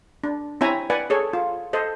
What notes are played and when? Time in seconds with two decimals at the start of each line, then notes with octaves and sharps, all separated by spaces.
0.24 D4
0.61 C4 E4 C#5 E5 G#5 A#5
0.90 B4 D5 F#5 G#5
1.10 G#4 A4 C#5
1.33 F4
1.73 A4 C5 D#5